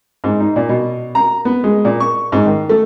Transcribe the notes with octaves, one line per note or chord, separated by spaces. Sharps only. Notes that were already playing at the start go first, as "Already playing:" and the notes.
G#2
D#4
A#2
B2
A#5
B3
G#3
A#2
C#6
G#2
D#3
A3